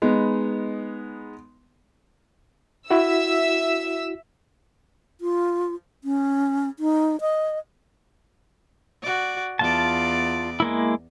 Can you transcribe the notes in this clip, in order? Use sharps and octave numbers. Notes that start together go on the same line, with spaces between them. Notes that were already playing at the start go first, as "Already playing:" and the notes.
G#3 B3 D#4
E4 F#4 E5 E6
F4
C#4
D#4
D#5
F#4 D5
E2 F4 D5 A5
G#3 A#3 E4